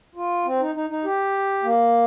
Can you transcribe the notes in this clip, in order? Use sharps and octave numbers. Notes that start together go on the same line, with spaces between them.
F4
C4
D#4
D#4
D#4
G4
A#3